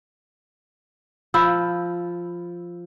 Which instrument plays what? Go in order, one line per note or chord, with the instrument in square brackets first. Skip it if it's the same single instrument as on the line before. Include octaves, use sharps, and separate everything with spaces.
[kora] F3 [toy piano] B5 E6